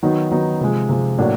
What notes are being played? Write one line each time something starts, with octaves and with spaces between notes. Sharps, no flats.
D#3 F#3 B3 D#4
D#3 F#3 B3 D#4
C3 F3 G#3
C3 F3 G#3
A2 F#3 A#3 D4 F#4